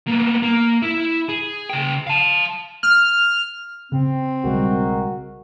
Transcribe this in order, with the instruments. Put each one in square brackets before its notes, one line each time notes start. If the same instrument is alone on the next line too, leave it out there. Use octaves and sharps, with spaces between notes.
[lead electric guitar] A#3 B3
A#3
E4
G#4
C#3 G5
F5 A5
[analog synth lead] F6
[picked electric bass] C#3 [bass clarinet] C4
[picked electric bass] B1 C#3 G3 [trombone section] G#3 F#4 A#4